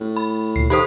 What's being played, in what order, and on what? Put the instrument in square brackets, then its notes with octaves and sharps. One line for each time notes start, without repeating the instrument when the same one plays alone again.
[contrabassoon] A2
[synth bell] B5
[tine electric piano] D2 A#2 [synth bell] C7
[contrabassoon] D#3 [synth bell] G4 A4 C5 [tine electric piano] B5 D#6